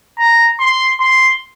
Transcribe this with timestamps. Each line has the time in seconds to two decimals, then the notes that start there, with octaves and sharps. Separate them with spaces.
0.19 A#5
0.60 C6
1.00 C6